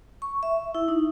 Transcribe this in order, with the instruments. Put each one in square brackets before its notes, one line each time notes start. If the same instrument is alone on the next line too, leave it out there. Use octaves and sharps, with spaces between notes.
[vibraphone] C#6
E5
E4
D#4